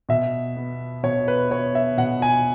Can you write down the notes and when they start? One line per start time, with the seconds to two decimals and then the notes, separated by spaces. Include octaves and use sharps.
0.09 B2 E5
0.56 B3
1.03 B2 C#5
1.28 B4
1.50 B3 C#5
1.75 E5
1.98 B2 F#5
2.22 G#5